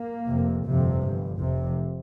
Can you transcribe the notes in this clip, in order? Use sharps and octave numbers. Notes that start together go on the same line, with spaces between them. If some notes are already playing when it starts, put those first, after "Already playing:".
Already playing: A#3
F1 F2 C3
G1 F2 C3 F3
G1 G2
F1 F2 C3